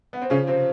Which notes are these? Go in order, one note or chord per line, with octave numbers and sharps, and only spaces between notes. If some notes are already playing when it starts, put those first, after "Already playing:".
B3
C4
C#3 F3 C#4
C3 C4